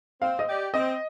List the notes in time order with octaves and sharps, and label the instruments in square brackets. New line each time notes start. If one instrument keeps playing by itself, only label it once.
[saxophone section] C4 [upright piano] F5
[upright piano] D#5
[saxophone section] G4 D5
[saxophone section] C4 [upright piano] D#5